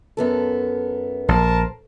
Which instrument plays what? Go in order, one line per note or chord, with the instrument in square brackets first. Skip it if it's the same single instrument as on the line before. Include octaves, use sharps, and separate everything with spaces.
[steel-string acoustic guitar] F#2 B3 A4
[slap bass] A#1 [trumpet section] A#4 A5 [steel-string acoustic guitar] C5